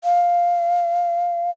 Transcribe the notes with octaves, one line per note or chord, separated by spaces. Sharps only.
F5